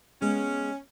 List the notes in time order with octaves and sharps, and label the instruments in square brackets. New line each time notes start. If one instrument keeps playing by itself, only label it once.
[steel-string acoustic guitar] G#3 B3 [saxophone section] C#4